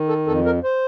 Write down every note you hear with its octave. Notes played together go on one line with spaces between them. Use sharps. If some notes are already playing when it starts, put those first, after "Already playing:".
Already playing: D#3
A4
F2 A4
A#4
C5